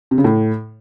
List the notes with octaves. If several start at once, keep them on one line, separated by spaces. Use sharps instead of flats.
C3
C#3
A2